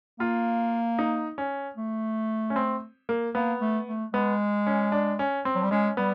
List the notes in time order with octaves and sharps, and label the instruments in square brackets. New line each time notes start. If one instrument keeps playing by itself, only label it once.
[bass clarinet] A#3 [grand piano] F4
[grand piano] D#4
C#4
[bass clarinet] A3
[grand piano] C#4
C4
A#3
[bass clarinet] A#3 [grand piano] B3
[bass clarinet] A3
A3
[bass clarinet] G#3 [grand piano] B3
[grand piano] C#4
D4
C#4
C4
[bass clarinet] F#3
G3
[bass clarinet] G#3 [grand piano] C#4
[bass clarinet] G3 [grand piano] B3